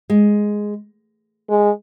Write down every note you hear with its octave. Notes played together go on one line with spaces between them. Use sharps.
G#3
G#3